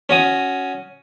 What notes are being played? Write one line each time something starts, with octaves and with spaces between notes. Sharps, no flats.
C#4 F#4 D#6